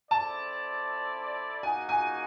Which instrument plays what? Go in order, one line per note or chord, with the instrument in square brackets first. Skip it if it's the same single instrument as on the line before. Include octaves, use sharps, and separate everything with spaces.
[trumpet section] C4 E4 A4 D5 [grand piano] A5
[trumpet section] A#3 D#4 F#4 [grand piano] G#5
[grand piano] G#5